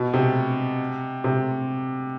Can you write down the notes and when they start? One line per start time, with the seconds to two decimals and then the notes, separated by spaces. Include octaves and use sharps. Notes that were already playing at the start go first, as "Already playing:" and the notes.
Already playing: B2
0.14 C3
1.24 C3